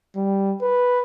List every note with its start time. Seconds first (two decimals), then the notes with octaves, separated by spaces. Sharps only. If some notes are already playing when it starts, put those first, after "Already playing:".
0.16 G3
0.62 B4